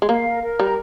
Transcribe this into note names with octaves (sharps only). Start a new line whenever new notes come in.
G#3
A#3 F5
A#4
A#4
G3 A#5